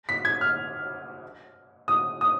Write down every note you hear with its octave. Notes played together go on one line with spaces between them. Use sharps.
B6
G#6
F6
D#6
D#6